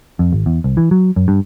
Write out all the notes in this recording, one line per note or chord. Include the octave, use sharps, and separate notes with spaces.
F2
G#1
E2
C2
E3
F#3
F#2
G2